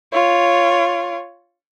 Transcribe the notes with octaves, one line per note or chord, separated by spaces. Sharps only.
F4 C#5